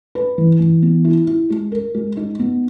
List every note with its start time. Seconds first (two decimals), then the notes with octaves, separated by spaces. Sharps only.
0.15 B4
0.38 E3
0.60 E3
0.82 B3
1.04 E4
1.27 E4
1.50 G#3
1.72 A#4
1.94 G#3
2.17 D#4
2.39 B3